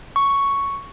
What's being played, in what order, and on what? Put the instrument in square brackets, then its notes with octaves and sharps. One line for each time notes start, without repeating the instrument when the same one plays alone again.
[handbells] C#6